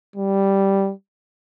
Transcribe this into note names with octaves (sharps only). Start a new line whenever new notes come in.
G3